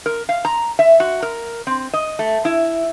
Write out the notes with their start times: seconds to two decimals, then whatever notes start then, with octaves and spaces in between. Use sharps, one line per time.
0.06 A#4
0.29 F5
0.45 A#5
0.79 E5
1.00 F#4
1.22 A#4
1.67 C4
1.93 D#5
2.19 A3
2.45 E4